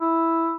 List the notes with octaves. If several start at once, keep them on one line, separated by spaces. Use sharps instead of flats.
E4